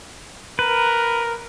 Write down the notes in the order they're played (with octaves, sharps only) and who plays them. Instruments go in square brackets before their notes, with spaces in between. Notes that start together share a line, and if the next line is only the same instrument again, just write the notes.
[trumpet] A#4 [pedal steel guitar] B4